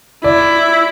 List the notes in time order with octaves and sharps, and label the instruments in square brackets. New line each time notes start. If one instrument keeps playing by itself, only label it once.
[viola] E4 [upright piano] D5